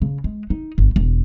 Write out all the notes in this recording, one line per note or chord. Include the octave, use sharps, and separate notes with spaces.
C#3
G#3
D#4
G1
E1